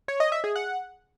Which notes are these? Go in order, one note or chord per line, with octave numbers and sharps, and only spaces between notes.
C#5
D#5
E5
G#4
F#5